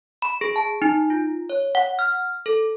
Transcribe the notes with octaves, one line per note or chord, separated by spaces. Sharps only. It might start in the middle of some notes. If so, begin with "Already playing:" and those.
B5
G#4
A5
D#4
F4
C#5
F#5
F6
A4